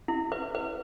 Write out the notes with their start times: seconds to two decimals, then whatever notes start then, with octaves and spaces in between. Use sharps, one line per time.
0.08 E4
0.32 B4
0.55 B4